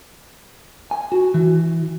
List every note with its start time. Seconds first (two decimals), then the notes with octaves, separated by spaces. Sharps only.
0.91 G#5
1.12 F#4
1.34 E3